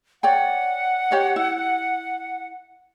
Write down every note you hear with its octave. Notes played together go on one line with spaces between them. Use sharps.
C#5 D5 F#5 G5
G4 C#5 D#5
E4